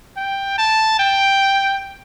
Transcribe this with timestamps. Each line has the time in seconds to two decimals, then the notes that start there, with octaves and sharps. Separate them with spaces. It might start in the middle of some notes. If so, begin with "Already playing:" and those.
0.17 G5
0.58 A5
0.99 G5